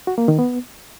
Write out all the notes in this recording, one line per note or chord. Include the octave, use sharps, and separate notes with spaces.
F#4
A#3
D#3
B3